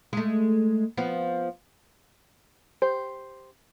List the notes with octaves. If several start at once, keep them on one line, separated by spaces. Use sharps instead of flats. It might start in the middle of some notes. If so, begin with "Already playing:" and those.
G#3 A3
F3 B3
G4 C5